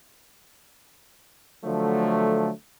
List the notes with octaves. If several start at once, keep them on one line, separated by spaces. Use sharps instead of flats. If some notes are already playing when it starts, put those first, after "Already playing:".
D3 F3 F#3 A3